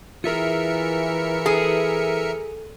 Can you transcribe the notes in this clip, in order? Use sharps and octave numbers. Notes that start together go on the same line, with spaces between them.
E3 F4 G#4 A#4 E5 C#7
G#4 A4